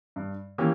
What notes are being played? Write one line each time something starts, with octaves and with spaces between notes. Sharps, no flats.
G2
E3 A#3 C#4 G4